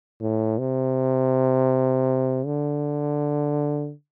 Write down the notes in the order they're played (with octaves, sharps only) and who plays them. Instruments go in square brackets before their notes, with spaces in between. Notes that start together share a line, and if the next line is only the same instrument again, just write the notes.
[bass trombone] A2
C3
D3